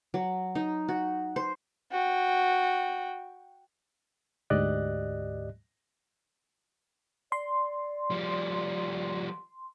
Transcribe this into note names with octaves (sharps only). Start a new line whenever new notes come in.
F#3
D#4
F#4
C5
F#4 G5
D2 G#2 G4 D5 D#5 F#6
D5 C6
F3 G3